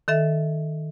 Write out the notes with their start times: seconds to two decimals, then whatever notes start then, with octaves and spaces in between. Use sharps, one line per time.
0.08 D#3 A4 E5